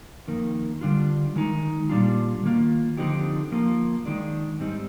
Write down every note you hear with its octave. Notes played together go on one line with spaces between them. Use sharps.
F2 D#3 A#3
D3 G3 D4 F4
D#3 G#3 D#4
A#2 G3 D4 F4
D#3 A#3 F4
D3 F3 C4 D#4 G4
F3 A#3 F4
D#3 G#3 D4
G#2 G3 C4 D#4